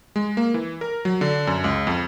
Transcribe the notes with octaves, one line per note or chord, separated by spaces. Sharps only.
G#3
A#3
E3
A#4
F#3
D3
F#2
C#2
F2